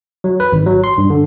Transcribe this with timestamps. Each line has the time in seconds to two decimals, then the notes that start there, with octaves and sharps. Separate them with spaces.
0.24 F#3
0.40 B4
0.52 G#1
0.66 F#3
0.84 C6
0.98 G2
1.10 D3